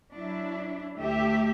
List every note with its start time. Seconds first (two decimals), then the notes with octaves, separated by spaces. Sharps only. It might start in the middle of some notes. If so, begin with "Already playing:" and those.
0.12 F#3 D4 E4
0.98 D2 A3 G4 E5